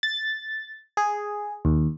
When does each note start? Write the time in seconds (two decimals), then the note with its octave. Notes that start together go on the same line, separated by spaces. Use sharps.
0.03 A6
0.97 G#4
1.65 D#2